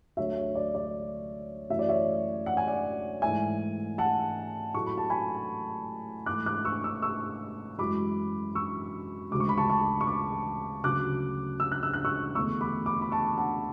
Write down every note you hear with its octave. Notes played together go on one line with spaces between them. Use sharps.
D2 D3 F#3 A3 C#5 E5
C#5
D5
D5
F#2 E3 A3 E5
D5
C#5 E5
F#5
G#5
D5 F#5
G#2 E3 A3 E5 G#5
F#5 A5
A2 F#3 A3 C#6
B5
A5
G#5 B5
G#2 E3 A3 D6 F#6
D6 F#6
C#6 E6
C#6 E6
C#6 E6
F#2 E3 G#3 B5 D6
C#6 E6
D2 C#3 G#3 D6
C#6
B5
A5 C#6
A5 C#6
C#6
B5 D6
D2 C#3 F#3 D6 F#6
E6
F#6
E6
F#6
C#6 E6
E2 D3 A3 C#6 E6
B5 D6
B5 D6
B5
A5 C#6
F#5 A5